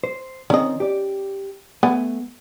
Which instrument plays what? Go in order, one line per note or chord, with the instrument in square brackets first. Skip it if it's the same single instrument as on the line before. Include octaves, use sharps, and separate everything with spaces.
[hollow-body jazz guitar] C5
[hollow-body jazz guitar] D#3 C4 [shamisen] C#4 D#5
[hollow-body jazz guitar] G4 D5
[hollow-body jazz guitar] A3 G#5 [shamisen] B3